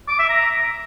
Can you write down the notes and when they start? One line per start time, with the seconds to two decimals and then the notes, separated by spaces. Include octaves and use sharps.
0.08 D6
0.19 E5
0.29 A#5